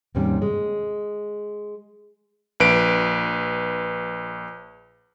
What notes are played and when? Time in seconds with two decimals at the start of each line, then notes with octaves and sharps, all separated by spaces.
0.15 D#2 G#2 C3 G3 C#4
0.42 G#3
2.60 A#1 B4 D7